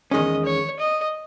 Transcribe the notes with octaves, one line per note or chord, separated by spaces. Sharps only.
E2 D#3 G#3 C#4 D#5
C#5
D#5